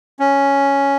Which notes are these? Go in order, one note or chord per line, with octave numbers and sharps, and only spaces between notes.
C#4